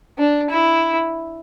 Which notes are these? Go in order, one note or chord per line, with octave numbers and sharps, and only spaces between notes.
D4
E4